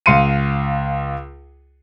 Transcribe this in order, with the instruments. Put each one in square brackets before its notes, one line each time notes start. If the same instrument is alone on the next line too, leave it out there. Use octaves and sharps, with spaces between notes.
[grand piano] C#2 F5 C6 C#7 D#7